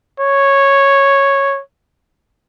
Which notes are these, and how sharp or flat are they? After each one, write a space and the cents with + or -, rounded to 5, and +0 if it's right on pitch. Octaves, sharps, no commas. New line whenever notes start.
C#5 -5